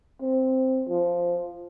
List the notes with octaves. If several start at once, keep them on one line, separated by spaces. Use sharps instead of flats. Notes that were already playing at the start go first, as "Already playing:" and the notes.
C4
F3